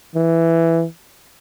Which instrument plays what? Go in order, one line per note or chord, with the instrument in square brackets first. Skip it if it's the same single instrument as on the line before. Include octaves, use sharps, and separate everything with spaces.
[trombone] E3